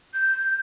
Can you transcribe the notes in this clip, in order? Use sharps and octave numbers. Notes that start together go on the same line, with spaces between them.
G6